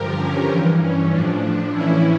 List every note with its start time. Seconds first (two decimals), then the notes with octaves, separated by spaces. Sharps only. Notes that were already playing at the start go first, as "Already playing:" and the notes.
Already playing: G2 D3 F3 G4 A#4
0.17 C#4
0.49 G2 E3
0.79 C#4
1.10 A2 F3 D4
1.72 A2 E3 C#4 E4